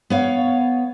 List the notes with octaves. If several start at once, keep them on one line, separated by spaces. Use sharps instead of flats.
B3 C#5 F5